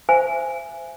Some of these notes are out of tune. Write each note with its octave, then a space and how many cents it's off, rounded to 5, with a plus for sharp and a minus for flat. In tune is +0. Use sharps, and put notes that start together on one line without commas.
C5 -20 E5 +40 G#5 +0